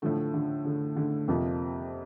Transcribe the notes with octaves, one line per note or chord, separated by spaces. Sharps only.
A2 D3 F3 A3
D3
D3
D3
F2 C3 F3 A#3